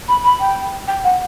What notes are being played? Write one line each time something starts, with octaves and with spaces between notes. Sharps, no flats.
B5
B5
G5
G5
F#5